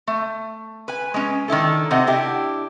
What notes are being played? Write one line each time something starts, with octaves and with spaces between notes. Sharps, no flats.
A3
B4 G#5
G#3 C#4
D#3 D4 E4 A4
C3 C5 D#5 F#5
D4 E4 G4